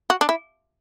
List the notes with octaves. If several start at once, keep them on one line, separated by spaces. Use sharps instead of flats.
F#4
D4
E4